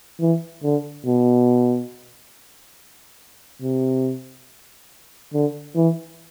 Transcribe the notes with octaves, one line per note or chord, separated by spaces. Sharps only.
E3
D3
B2
C3
D3
E3